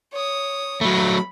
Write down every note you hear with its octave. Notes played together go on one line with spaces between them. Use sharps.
C#5 D#6
F#3 A3 B5